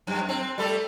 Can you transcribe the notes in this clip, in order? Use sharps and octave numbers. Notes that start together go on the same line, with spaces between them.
F#2
C4
G3 A3 A4